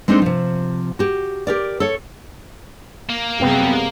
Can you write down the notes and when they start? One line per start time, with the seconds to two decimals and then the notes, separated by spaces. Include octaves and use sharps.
0.08 G#3 C4 D4 D#4 A4 C5
0.22 C3 F3
0.99 F#4 G4
1.47 G4 A#4 D5
1.80 A4 C#5
3.09 A#3
3.39 F#2 C3 G3 G#3 B3 C4